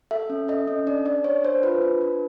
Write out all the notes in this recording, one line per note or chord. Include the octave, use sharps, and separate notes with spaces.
A4 E5
C#4
A4 D#5
C#4
D4 D5
D4 D5
D4 C#5
D4 C5
F4 B4
D4
D4